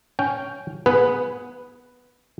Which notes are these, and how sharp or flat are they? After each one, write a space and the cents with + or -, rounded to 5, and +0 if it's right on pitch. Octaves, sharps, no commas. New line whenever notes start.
C#4 +5 G5 +0
B3 +0 G#4 +0 B4 +0